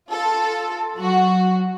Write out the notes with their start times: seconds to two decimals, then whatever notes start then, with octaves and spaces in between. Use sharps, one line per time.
0.11 F4 A4
0.97 F#3 F#4